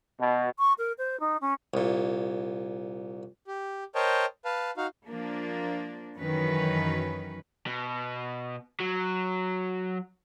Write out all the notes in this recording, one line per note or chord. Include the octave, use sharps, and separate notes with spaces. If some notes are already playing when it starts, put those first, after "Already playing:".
B2
C#6
A#4
C5
D#4
C#4
C2 A#2
G4
A#4 C5 C#5 D#5 G5 A5
B4 F5 A5
D#4 F#4 F5
F3 A#3 D4
F#2 D#3 E3 F#3 C#4 B4
B2
F#3